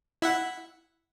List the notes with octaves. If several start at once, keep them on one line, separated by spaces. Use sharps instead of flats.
E4 E5 F#5